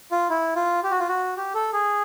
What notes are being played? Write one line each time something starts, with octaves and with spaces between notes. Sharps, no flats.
F4
E4
F4
G4
F#4
F4
F#4
G4
A4
G#4